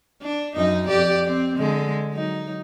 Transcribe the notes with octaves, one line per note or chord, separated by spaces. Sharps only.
D4
F#2 D#4 D#5
F2 G4 D5
C4
D3 G#3
F#3 D#4